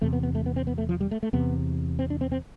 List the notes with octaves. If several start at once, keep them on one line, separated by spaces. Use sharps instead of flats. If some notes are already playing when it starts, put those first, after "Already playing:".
E2 C3 A3
B3
B3
A3
B3
C4
B3
A3
F3
G3
A3
A3
E2 C3 B3
C4
D4
C4
C4